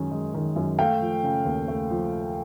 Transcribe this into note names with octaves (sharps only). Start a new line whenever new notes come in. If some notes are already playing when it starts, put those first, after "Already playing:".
Already playing: F#2 D#3 G#3 C#4
G#3
D#3
F#2
A3 F5 G5
F3
C#3
D#2
A3
F3